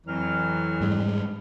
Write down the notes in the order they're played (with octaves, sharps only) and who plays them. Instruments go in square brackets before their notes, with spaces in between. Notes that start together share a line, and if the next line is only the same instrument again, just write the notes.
[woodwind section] F2 F#3 F6 [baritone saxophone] E3
[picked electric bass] G#2 G3 G#3